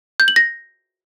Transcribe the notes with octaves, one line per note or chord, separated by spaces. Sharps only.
G6
F#7
A#6